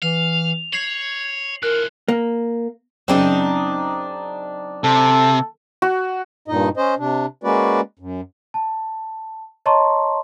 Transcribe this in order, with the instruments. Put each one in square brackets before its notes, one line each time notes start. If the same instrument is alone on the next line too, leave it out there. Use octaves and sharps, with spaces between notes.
[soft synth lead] E3 [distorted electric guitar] F5 [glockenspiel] F7
[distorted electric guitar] C#5 [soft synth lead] G#6 [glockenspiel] C7 F#7
[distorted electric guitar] E3 F3 [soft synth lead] A#4 [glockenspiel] F#6
[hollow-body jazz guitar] A#3
[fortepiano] F#2 C#3 [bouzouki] C4 D4 D#4
[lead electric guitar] C3 [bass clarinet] A4
[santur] F#4
[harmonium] G2 A#2 D#4 D#5
C#4 C5 D#5
C3 D4
G#3 A#3 C#4 F#4 B4 D5
F#2
[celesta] A5
C#5 D#5 A5 A#5 C6 C#6